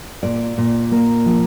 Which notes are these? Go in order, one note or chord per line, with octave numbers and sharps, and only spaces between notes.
A#2 D5
A#2
A#3
F3